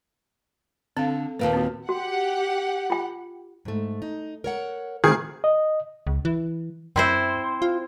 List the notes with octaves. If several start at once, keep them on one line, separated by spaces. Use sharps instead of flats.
D3 C4 F5
D#2 A#2 A#3 B4 F5 A5
C4 F#4
F#4 G4 F#5
F4 G5
G#2 A3
D#4
A#4 C#5 F#5
D#3 A3 C4 F#4 G#4
D#5
C#2
E3
F#2 C4 E4 C5
F4